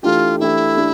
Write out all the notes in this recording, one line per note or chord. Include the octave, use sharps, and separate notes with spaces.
E3 A3 D4 F4 G4
E3 A3 D4 E4 G4
A3 D4 G4